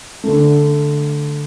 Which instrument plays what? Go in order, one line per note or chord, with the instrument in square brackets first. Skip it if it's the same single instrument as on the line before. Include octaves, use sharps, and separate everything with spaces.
[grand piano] D3 A3